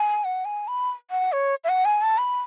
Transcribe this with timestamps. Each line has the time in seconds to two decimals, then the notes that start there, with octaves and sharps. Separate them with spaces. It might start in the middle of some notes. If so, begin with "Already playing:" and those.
Already playing: G#5
0.24 F#5
0.45 G#5
0.68 B5
1.11 F#5
1.32 C#5
1.64 E5
1.69 F#5
1.85 G#5
2.02 A5
2.18 B5